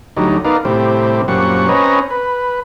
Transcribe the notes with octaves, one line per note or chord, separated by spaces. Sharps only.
D2 F#3 G3 D#4
B3 D#4 A#4 D5 F5
A2 C3 G3 C4
F#2 A#2 G3 C4 F#5 C#6
C4 C#4 B4 C#5 D#5 A#5
B4